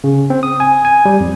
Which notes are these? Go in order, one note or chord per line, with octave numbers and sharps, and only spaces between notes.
C#3
C4
D#6
G#5
G#5
G3
F2